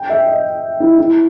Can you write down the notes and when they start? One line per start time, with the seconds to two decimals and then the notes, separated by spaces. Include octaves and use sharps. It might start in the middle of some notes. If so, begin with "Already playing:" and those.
Already playing: G5
0.09 E5
0.27 D#5
0.80 E4
0.98 E4